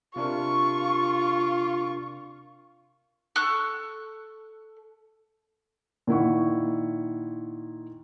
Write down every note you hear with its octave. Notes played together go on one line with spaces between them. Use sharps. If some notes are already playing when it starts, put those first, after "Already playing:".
C3 D4 F4 A#4 C#6
A4 C#6 F#6
A#2 D#3 E4 F#5 C#6